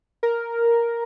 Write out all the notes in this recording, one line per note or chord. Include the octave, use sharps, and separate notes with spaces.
A#4